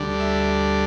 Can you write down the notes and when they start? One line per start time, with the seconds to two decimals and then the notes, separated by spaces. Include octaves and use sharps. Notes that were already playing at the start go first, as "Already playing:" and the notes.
Already playing: D2 D3 G3 D4
0.20 E5